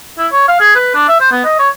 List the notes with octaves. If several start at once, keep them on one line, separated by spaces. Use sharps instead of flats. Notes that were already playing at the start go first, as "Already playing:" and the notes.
E4
C#5
F5
G#4
B4
D4
E5
C5
B3
D#5
C#5